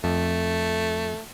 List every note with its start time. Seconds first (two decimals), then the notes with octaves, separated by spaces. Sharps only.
0.04 F2 A3